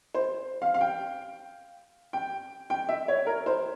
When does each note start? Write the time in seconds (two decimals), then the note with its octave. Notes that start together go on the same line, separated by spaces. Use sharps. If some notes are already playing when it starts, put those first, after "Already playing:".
0.14 C5
0.62 F5
0.74 F5
0.81 G5
2.13 G5
2.70 G5
2.89 E5
3.08 C#5
3.27 A#4
3.46 C5